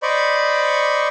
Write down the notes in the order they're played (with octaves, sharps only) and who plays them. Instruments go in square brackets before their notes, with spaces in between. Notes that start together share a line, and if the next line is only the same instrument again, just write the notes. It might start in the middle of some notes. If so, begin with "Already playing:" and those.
[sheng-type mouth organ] C5 D5 D#5 B5 C#6